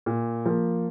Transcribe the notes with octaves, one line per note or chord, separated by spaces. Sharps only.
A#2
F3 A#3